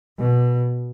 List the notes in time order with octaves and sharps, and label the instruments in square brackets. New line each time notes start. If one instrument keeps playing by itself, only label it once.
[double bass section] B2